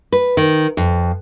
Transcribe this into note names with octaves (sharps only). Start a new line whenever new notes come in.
B4
D#3
F2